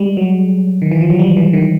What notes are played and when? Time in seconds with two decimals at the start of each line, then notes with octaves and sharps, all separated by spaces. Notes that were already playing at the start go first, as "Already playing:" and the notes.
Already playing: G3 G#3
0.17 F#3
0.82 D#3
0.91 E3
1.01 F3
1.10 F#3
1.19 G3
1.37 E3
1.53 D#3